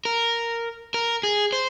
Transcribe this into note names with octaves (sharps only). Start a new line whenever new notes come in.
A#4
A#4
G#4
C5